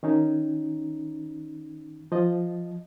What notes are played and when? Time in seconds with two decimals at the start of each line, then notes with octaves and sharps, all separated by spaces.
0.03 D#3 C#4 D#4
2.12 F3 D#5